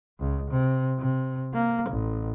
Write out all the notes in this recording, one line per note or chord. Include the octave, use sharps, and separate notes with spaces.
C#2
C3
C3
A#3
A1